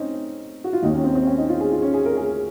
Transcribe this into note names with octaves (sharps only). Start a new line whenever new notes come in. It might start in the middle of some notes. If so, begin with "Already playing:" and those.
Already playing: C4 C#4 D#4
F#4
F4
D#2 D#3 D#4
C#4
C4
C4
C#4
D#4
F4
G#4
F4
C#4
G#4
A#4
G#4